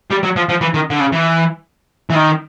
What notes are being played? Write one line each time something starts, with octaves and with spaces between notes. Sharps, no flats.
G3
F#3
F3
F3
E3
D#3
D3
C#3
E3
E3
D#3